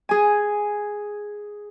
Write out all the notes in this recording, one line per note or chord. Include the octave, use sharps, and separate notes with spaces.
G#4 G#5